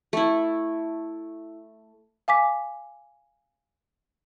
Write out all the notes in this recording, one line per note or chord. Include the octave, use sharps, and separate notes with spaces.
A3 E4
F5 G#5 D6 B6